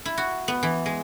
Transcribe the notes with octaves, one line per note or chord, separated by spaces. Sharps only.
E4
F#4
B3
E3
G#3